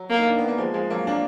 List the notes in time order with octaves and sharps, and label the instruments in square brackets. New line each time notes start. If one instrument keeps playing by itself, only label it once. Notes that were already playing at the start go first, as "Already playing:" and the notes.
Already playing: [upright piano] F#3
[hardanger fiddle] A#3
[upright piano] D#4
D4
B3
A#3
F3 G#3
F3 G#3
F#3 A#3
A#3 D4